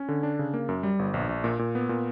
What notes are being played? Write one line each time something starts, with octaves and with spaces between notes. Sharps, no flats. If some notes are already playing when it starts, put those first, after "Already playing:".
Already playing: C#4
D3
D4
C#3
A#3
F#2
G3
G1
A#1
A#1
A#2
A#2
B3
A#2